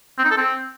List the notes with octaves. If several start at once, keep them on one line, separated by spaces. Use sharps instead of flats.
C4
D#4
A4
C4